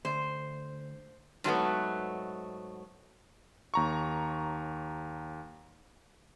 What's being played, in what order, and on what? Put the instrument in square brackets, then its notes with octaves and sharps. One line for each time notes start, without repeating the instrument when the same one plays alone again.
[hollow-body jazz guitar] D2 [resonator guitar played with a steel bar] C5
[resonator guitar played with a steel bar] G#2 F#3 A3 B3
[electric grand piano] D#2 A#5 C#6